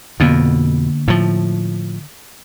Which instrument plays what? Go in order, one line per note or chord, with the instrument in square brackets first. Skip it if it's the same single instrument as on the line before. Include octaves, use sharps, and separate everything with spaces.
[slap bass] F2 B2 [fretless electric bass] D3 A#3 B3
[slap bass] A2 F3